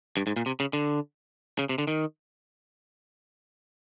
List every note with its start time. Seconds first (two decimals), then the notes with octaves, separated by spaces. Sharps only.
0.17 G2
0.27 G#2
0.36 A#2
0.46 C3
0.60 C#3
0.73 D3
1.59 C#3
1.69 C3
1.78 D3
1.87 D#3